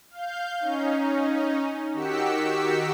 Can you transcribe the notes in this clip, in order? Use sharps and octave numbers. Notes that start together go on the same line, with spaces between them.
F5 G6
C#4 D#4
D#3 F#4 G4 E6 B6 C#7